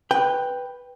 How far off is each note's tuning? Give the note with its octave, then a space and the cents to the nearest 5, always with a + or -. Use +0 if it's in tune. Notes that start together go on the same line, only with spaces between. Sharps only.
B4 +0 G5 +5